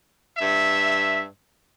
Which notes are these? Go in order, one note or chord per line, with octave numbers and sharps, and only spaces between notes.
G2 E5